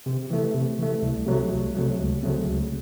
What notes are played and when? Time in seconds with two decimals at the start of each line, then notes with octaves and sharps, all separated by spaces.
0.06 C3
0.30 E3 A3
0.54 C3
0.79 E3 A3
1.02 C2
1.26 C3 F#3 A3
1.50 C2
1.75 C3 F#3 A3
1.99 C#2
2.23 C#3 F#3 A3 C4
2.47 C#2